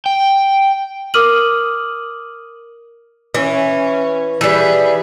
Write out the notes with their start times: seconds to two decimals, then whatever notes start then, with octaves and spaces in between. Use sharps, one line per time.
0.06 G5
1.14 A#4 D6 D#6 F6 D#7 F#7
3.34 E3 C#4
4.41 E3 G3 G#4 B4